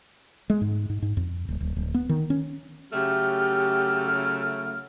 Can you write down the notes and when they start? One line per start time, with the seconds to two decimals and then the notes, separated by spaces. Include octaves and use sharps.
0.50 G#3
0.61 G#2
0.90 G#2
1.02 G#2
1.17 F2
1.48 D1
1.61 D1
1.76 D1
1.94 B3
2.09 D#3
2.30 C#4
2.92 C#3 F#3 A3 G4 F6